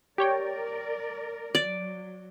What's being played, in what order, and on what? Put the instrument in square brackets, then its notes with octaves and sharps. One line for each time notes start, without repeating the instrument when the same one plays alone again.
[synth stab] G4 C#5 G5 [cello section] A#4 D5
[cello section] F#3 [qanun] D5